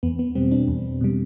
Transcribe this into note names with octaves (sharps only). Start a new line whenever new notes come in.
E2 B3
B3
B2 G3 C4
D4
E2
B2 G3